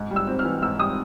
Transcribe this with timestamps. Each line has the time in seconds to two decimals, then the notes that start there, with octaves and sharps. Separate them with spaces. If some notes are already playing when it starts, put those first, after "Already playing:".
Already playing: G#2
0.11 G3
0.16 E6
0.27 C4
0.39 F6
0.44 E3
0.62 G#2 E6
0.79 G3 D#6